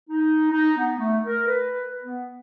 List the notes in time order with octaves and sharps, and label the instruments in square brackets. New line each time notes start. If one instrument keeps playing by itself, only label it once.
[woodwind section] D#4
D#4
B3
A3
A#4
B4
B3